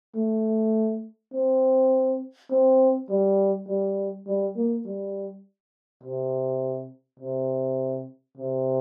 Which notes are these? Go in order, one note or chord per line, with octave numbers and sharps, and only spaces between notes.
A3
C4
C4
G3
G3
G3
A#3
G3
C3
C3
C3